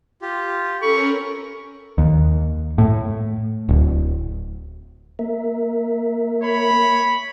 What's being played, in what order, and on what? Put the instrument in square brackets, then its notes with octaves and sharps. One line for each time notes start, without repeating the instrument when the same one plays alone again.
[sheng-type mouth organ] F4 G4
[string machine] C#4 A#4 [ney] A4 [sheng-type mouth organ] B5 [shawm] C#6
[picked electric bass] D#2
A2
D1
[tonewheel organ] A#3 A#4 E5
[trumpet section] C#5 B5